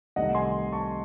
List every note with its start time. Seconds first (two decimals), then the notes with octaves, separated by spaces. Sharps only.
0.16 C2 C3 D#3 A3 D#5 F#5
0.35 G#5 C6
0.72 A5 C#6